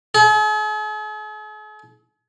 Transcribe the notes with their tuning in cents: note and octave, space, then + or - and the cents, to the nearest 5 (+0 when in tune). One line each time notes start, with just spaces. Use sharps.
G#4 +45